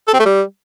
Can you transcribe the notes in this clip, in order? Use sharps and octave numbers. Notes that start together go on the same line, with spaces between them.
A4
C4
A3
G3